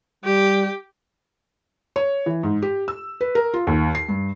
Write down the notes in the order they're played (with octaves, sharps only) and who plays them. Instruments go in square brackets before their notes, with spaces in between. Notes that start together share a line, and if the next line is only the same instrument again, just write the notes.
[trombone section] G3 [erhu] G4
[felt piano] C#5
E3
G#2
G4
E6
B4
A#4
F4
D#2
C7
G2